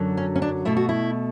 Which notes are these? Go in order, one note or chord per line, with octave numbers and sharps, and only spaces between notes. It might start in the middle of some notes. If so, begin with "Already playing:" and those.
Already playing: F#2 D3 F#3
C#4
C#4
D4
B2 A3 E4
F#4
E4